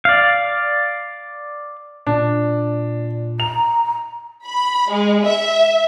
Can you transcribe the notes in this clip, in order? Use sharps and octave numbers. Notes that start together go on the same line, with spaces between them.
D5 F5
A#2 D4
A#5 F7
B5
G#3
E5